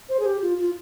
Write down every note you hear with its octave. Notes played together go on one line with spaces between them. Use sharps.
C5
G#4
G4
F4
F4